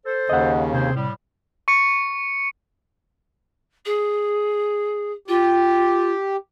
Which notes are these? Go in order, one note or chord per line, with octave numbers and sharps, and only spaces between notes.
A4 C5
D#2 C#3 D#5 F#5
C3 C4 G#4 C5
A2 G3
C#6 C#7
G#4
F4 G4